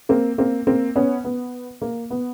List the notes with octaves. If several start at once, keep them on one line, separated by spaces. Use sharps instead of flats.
A#3 C4
A#3 C4
A#3 C4
B3 C#4
B3
A#3
B3